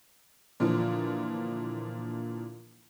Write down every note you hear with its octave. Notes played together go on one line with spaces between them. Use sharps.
A#2 D3 E3 F3